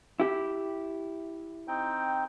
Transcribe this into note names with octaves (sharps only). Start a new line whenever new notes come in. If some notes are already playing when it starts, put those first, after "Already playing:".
E4 G4
C4 D#4 G5